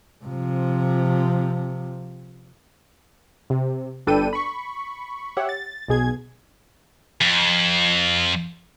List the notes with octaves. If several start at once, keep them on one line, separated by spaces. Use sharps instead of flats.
C3 F3
C3
G1 D4 A4 B4 G5 D#7
B5 C#6
G4 C#5 E5 F#5
A6
B1 B2 G#4 G#6
F2